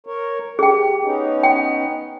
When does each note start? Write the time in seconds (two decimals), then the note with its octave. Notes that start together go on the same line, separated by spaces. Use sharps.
0.06 A#4 C#5
0.59 G4 G#4 G5
1.03 B3 C#4 D#4
1.43 G5